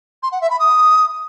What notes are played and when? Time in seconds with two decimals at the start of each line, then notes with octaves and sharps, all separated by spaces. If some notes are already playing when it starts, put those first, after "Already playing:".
0.22 C6
0.31 F#5
0.40 E5
0.50 B5
0.59 D#6